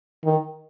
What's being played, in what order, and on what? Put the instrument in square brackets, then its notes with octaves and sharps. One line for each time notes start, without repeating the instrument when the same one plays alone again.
[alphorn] D#3